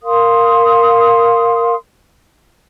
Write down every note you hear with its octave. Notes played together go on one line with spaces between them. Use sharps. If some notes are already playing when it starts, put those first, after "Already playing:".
A#4 F5 C6 D#6